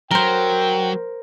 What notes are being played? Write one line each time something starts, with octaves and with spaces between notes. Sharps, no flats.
F#3 A#4 C5 G5